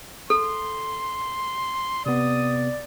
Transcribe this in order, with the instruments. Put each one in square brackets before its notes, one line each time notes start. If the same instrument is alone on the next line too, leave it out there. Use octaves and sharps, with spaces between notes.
[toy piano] A4 [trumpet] C6
[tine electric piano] C3 B3 [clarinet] D5 [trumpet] D#6